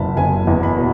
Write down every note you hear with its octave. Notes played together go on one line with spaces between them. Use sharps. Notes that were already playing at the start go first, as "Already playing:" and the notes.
Already playing: F#1 E2 B2 A5 B5
F#1 G#5
E2
B5
B2